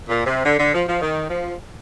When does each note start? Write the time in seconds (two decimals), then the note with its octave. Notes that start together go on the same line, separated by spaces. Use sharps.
0.08 A#2
0.26 C3
0.45 D3
0.59 D3
0.73 F3
0.87 F3
1.01 D#3
1.29 F3